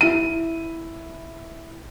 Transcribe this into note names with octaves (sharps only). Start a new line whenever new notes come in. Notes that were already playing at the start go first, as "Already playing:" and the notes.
E4 D#7